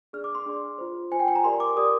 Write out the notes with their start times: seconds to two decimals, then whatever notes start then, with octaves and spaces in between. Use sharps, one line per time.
0.13 D4 G#4 D5 F6
0.24 D6
0.35 C6
0.46 D4 G#4 D5
0.78 F4 C5
1.11 F4 C5 G#5
1.20 G5
1.28 G#5
1.35 A#5
1.44 G4 A#4 D5 C6
1.60 D6
1.76 G4 A#4 D5 D#6